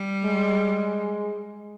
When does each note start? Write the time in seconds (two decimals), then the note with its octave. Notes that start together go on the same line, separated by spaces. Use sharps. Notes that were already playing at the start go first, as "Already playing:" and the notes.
Already playing: G3
0.25 G#3